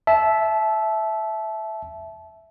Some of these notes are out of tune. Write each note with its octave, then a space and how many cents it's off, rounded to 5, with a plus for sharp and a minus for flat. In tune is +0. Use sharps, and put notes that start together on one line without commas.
E5 +0 A5 -25